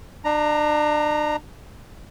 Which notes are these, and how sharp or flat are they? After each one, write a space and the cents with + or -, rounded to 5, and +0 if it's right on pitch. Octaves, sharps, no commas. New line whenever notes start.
D4 +35 A#5 +0